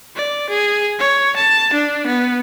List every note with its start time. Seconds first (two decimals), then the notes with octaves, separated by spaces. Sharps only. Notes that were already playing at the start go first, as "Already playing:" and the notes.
0.16 D5
0.50 G#4
0.99 C#5
1.36 A5
1.73 D4
2.06 B3